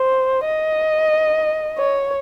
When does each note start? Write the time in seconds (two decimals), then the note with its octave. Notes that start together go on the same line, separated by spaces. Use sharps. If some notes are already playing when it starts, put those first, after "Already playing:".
Already playing: C5
0.45 D#5
1.78 C#5